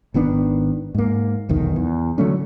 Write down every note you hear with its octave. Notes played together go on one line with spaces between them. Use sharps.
G#1 D#3 B3 D4
G#2 A#3
F1 B1 E2 D#3
E2
D3 F#3 A3 C#4